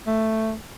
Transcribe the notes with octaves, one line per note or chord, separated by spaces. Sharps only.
A3